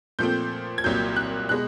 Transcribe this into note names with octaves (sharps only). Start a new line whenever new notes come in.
A#2 F3 A3 C4 G6
G#6
C2 A#2 F#3 G6
F#6
B2 G#3 F#6